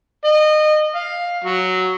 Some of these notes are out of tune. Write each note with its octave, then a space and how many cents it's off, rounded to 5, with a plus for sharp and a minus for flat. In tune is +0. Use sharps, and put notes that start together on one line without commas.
D#5 -25
F5 +10
F#3 +5